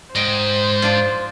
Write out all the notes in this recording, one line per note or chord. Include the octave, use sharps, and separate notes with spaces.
G#2 C5 D#5 G5
F3 D4 F4